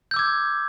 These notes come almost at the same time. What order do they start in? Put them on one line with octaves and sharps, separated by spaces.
G6 E6 D6 G#6